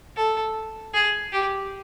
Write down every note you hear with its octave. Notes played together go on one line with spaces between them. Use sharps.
A4
G#4
G4